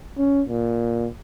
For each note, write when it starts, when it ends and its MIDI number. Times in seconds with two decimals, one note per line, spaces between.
0.18 0.42 61
0.49 1.08 46